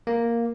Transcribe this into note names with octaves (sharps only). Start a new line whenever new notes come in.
A#3